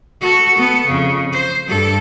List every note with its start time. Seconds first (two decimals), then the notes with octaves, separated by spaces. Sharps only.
0.21 F#4 A4
0.55 B3 A4
0.86 F2 C#3
1.32 C5
1.68 G2 A4